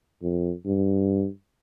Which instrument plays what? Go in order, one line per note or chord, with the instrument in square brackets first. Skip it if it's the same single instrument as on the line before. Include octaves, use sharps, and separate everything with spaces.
[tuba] F2
G2